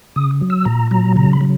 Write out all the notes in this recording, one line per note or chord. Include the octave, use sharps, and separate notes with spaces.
C#3 D#6
F#3
E6
A#2 A#5
F#3 A#5
C#3 A#5
B5
F#3